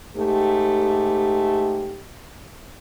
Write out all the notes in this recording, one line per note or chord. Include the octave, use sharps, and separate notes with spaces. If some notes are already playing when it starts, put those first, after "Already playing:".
G#2 A3 G4